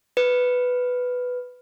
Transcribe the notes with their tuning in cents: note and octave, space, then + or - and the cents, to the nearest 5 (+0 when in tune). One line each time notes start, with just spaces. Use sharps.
B4 +5